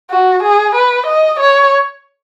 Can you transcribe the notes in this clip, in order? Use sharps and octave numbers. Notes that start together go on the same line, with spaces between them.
F#4
G#4
B4
D#5
C#5